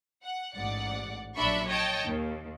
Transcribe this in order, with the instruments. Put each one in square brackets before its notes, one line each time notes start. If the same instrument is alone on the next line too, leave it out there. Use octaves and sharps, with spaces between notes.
[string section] F#5
A1 G#2 D5 F#5
A#1 F#3 D4 E5 B5 C#6
C#5 D#5 G5 A5
D#2